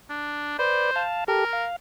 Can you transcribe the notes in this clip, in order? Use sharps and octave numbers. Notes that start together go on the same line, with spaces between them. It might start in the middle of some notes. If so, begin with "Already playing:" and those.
D4
B4 C5 D5
F5 A5
G4 A4 A#4
F5